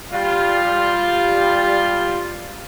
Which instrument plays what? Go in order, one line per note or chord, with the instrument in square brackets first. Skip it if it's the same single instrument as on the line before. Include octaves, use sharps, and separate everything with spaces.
[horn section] G3 F4